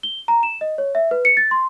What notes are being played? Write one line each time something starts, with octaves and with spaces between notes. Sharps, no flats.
G7
A#5
E7
D#5
C#5
E5
B4
C#7
A6
C6